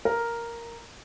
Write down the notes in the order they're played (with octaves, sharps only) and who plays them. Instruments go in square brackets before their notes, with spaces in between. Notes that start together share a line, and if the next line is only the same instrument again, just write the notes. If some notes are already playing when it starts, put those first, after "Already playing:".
[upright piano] A#4